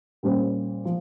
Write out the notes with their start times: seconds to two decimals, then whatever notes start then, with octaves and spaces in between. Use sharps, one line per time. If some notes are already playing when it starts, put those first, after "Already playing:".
0.23 A#2 G3 C#4 G4 C5
0.85 F3